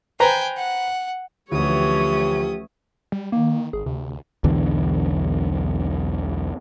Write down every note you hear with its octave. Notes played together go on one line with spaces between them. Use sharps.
B4 C5 G5 G#5 A#5
F#5
D2 E3 F3 A3 C#4 G4 C#5 D#6
G3
D#3 A#3
G#1 G#4
D2 C3
B1 E2 D3 E3